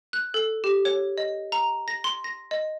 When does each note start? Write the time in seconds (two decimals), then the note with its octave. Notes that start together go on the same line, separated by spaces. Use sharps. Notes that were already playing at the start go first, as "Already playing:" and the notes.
0.13 F#6
0.34 A4
0.64 G4
0.85 C#5
1.18 D#5
1.52 A#5
1.88 A#6
2.04 C6
2.24 A#6
2.51 D#5